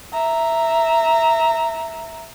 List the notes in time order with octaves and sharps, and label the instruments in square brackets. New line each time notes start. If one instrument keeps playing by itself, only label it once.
[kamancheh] E5 A#5